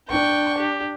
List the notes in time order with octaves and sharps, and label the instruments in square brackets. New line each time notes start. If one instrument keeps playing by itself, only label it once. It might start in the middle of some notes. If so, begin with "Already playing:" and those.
[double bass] D4 [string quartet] G5 C#6
[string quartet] G4